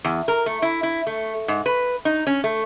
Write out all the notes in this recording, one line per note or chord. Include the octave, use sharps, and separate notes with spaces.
E2
A#4
A3
E4
E4
A3
G#2
B4
D#4
C#4
A3